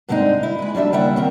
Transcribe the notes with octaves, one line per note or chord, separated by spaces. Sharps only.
G2 D3 G#3 C4 D#4
E4
G#3 B4
F#3 G3 D4 E5
D#2 C#3 G3 E4 E5 F#5
D#3 C4 A#4